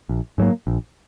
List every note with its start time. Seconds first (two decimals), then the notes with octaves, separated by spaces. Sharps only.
0.09 A#1
0.38 G#2 F#3 A#3
0.67 A#1